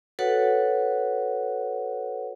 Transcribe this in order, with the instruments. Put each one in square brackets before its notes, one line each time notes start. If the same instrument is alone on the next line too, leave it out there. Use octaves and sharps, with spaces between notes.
[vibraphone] F#4 A4 B4 C#5 F#5